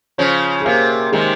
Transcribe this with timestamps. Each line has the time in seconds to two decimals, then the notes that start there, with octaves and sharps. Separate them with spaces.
0.18 C#3 F3 C#4 C#5
0.61 G#4
0.66 C3 A#3 A#4
1.12 C3 D#3 G#3 G#4